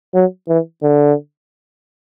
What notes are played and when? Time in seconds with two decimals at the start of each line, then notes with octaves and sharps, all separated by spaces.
0.14 F#3
0.48 E3
0.82 D3